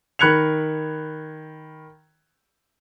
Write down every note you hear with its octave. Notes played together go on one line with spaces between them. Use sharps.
D#3 B5 F#6 G#6 C#7 F7